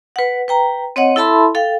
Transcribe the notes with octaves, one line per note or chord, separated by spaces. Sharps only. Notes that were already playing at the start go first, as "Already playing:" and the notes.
B4 F#5
B4 G5 A#5
C4 C#5 D#5 F#5
E4 A4 E5 A5 B5 C6
A4 F5 G5